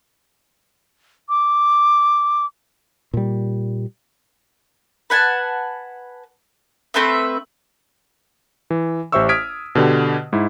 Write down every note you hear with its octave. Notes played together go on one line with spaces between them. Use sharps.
D6
A#2 G3
B4 F#5 G#5 A5
A3 C4 B4 E5
E3
A1 G4 C5 E5 C#6 E6
D#6 F6 G#6 B6 D7
B2 D3 G4
G#2 E4